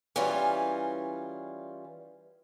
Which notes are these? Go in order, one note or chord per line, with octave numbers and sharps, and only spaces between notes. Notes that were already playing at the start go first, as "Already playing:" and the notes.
E3 G3 C#4 F4 G#4